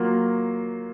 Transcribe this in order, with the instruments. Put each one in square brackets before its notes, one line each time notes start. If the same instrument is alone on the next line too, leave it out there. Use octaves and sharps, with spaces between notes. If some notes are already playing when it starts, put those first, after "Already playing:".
Already playing: [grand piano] F#3 A#3 F4